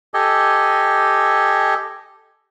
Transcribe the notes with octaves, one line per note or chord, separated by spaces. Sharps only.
G4 A4 D#5 G#5